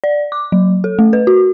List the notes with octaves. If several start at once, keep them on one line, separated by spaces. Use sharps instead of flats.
D5
D6
F#3
A4
A3
B4
F#4